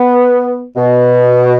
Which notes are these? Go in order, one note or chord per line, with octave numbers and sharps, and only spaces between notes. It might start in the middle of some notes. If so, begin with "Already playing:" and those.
Already playing: B3
B2